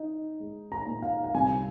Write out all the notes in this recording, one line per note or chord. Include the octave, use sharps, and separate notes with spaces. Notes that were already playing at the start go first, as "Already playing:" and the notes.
Already playing: D#4
G#3
A#5
A#2
F5
F5
C2 G#5